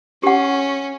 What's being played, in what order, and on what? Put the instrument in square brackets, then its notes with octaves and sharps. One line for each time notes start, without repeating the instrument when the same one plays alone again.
[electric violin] C#4 [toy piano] G4 F#5